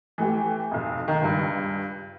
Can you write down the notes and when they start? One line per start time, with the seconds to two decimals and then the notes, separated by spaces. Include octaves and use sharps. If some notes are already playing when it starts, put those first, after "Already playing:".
0.18 E3 A3 G4
0.71 B1 F2
1.08 D#3
1.21 C#2 G2